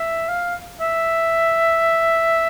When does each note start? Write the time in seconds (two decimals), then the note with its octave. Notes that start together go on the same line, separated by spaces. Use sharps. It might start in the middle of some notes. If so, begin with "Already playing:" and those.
Already playing: E5
0.29 F5
0.81 E5